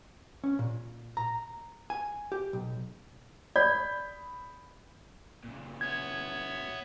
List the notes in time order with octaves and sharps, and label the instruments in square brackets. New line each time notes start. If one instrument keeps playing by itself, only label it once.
[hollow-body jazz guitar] C#4
A#2
A#5
G#5
G4
B1
[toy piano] D5 [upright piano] B5 G6
[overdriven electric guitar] A#2 C#3
[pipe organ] B3 C#5 E5 [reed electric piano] G#6